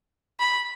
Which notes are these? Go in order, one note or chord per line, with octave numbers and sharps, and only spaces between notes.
B5